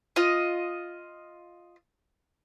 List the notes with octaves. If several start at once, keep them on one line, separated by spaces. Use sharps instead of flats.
F4 D#5